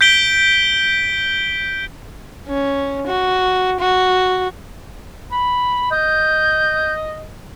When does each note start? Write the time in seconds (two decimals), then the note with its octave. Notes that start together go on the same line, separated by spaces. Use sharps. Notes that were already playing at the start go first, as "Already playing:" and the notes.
0.01 G6 B6 D7 G7
2.48 C#4
3.07 F#4
3.80 F#4
5.32 B5
5.91 D#5 G6